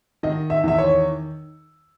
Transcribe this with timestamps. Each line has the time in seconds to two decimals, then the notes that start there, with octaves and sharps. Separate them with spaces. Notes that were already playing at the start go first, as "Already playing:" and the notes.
0.23 D#3 D#5
0.50 E5
0.64 E2 E5
0.78 C#5